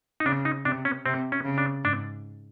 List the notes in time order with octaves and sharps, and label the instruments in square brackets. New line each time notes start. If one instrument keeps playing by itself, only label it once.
[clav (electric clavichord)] D#4
[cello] C#3 [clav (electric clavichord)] D4
[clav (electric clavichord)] D#4
[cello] C3 [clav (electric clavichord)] D4
[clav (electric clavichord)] C#4
[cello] C3 [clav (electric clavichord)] C4
[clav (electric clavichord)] C#4
[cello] C#3
[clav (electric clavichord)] D4
[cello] G#2 [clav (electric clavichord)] D4